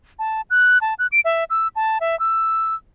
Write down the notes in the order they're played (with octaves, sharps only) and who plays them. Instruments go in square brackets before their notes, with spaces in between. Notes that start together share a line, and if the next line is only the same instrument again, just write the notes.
[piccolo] A5
F#6
A5
F#6
D7
E5
E6
A5
E5
E6